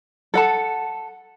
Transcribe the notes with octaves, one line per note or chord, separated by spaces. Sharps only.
A4 F#5 A5